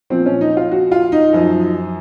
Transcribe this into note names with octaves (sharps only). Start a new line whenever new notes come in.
A#2 F3 C4
C#4
D#4
F4
F#4
F4
D#4
F#2 F3